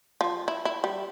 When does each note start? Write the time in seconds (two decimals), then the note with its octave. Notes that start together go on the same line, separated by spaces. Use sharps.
0.21 F3
0.48 E4
0.65 E4
0.84 G3